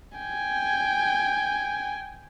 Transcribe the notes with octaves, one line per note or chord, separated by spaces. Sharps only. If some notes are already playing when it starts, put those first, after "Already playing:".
G5 G#5